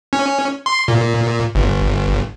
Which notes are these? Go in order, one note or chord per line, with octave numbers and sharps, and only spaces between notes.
C#4
C6
A#2
G1